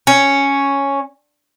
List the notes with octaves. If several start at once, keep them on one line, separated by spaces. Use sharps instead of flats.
C#4